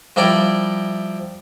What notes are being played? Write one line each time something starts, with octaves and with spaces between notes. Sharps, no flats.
F3 G3 E4 A#4 D5